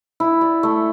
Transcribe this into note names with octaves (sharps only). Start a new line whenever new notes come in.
E4
D5
A3